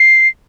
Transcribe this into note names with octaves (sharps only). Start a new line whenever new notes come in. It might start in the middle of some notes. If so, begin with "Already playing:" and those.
Already playing: C7